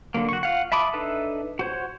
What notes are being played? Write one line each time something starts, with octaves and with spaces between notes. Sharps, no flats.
D3 F#3 A#3
F#4 C#6
F4 F5 F#5
E5 A5 B5 D6 D#6
D4 D#4 A4 B4 E5
F#4 C5 C#5